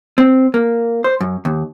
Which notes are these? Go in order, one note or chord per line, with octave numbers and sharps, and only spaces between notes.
C4
A#3
C5
F#2
D#2